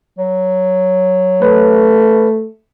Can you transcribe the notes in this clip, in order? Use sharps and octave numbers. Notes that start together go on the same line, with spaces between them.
F#3
A3 B4